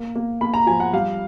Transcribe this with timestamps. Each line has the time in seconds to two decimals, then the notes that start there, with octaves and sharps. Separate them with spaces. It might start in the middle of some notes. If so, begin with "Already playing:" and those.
Already playing: A#3
0.15 A#3
0.41 A#3 B5
0.54 A#5
0.67 F3 G#5
0.80 F#5
0.93 G3 F5